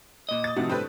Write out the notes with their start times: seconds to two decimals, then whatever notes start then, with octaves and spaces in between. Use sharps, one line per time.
0.29 A#2 D#5
0.44 D#6 A6
0.56 A2 C3 D#3 F3 F#4
0.70 G2 C4 G4 A4 B4